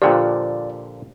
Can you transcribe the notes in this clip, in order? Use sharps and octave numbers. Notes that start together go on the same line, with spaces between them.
A#2 D3 F3 G4 C5 D5 G5